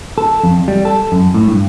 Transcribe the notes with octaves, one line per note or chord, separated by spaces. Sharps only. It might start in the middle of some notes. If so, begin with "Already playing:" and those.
A4
F2
G3
A4
F#2
A2
G2